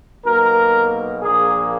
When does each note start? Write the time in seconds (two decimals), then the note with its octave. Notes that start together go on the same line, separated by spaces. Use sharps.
0.24 B1 B2 A#3 A#4
1.20 A#1 A#2 A#3 G#4